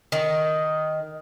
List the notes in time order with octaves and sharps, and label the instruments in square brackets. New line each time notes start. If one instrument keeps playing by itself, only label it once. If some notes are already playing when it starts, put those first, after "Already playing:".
[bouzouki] D#3